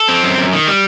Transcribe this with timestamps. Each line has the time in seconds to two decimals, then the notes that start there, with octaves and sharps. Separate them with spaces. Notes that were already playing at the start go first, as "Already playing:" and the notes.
Already playing: A4
0.08 C4
0.23 F#2
0.38 F#2
0.53 D#3
0.68 G3